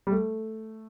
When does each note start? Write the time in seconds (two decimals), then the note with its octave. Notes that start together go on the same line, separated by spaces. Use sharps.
0.07 G3
0.12 A3